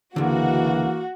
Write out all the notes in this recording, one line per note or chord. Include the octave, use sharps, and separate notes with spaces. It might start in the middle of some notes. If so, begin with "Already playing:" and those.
C#2 D3 E3 A#3 F#4